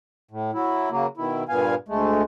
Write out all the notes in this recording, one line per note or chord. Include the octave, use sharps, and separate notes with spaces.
A2
F#3 E4
C#3 F#3 A#3
B2 D#3 E4
G2 A#2 B3 F5 G#5
D2 G#3 A3